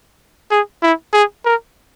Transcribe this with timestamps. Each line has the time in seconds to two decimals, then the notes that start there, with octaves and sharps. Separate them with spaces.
0.51 G#4
0.82 E4
1.13 G#4
1.45 A#4